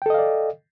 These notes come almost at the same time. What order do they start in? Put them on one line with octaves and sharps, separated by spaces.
G5 A4 D#5 F5 D5